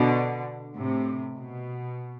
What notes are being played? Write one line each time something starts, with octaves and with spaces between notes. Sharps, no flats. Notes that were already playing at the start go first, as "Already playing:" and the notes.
Already playing: B2 D3
A2 C3
B2